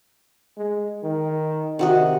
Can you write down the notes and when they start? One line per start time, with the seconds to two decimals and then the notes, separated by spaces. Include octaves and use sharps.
0.57 G#3
1.03 D#3
1.79 C3 D#3 F#4 D#5